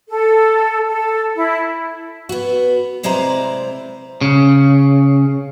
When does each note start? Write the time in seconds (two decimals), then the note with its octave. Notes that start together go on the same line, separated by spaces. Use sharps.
0.09 A4
0.87 A4
1.35 E4
2.29 B3 F#4
3.03 C3 G#3 E4 C5 D5 A#5
4.21 C#3